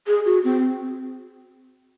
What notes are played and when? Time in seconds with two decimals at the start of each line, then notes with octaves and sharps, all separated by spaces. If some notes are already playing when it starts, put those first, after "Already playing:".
0.07 G#4
0.26 F#4
0.44 C4